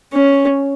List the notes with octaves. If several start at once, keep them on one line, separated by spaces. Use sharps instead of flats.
C#4